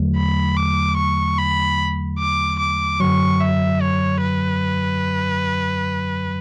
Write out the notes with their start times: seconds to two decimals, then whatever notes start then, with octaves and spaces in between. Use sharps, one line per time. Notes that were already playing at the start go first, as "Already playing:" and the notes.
Already playing: E2 D3 F#3 A3
0.16 B5
0.57 D6
0.97 C#6
1.38 B5
2.19 D6
2.60 D6
3.00 F#2 D3 F#3 C#6
3.41 E5
3.82 C#5
4.22 B4